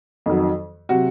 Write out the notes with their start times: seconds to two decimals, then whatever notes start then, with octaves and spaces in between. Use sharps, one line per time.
0.26 F2 D#3 F#3
0.89 C3 F#3 F#4